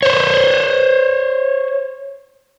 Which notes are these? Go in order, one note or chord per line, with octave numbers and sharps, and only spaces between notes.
C5 C#5